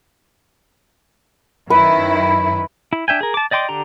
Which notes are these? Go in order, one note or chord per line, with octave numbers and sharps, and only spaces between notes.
F#2 D#3 E4 B4
E4
D4 E5 G5 G#5
G#4 A#4
A5 D6
D5 D#5 G5 C6 D6
D3 D4 G4 A#5